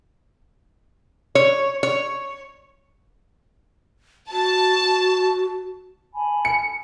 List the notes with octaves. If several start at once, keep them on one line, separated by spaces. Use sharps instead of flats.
C#5
C#5
F#4 A5
G#5 A5 B5
C#7